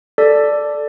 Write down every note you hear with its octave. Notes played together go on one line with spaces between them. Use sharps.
A4 D5